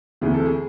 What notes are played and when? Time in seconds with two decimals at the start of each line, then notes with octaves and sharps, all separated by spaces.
0.21 D2 C3 E3 G#4
0.34 A4
0.45 G#4